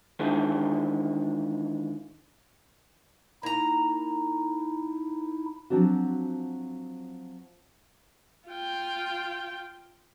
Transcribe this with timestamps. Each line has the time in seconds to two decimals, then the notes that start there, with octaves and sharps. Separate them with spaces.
0.20 D#3 E3 G#3 C#4 D4 F4
3.43 A#3 D#4 E4 A#5
5.70 F3 F#3 C4 D4 F#4
8.48 F4 G5